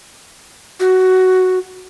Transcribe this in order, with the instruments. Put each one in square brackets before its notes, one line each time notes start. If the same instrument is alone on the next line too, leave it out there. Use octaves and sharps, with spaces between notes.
[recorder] F#4